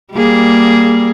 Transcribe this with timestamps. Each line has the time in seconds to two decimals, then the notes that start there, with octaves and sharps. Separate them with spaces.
0.14 G3 A#3 G#4